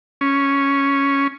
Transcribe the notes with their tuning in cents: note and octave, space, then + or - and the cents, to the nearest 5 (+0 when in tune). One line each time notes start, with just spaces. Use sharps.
C#4 +0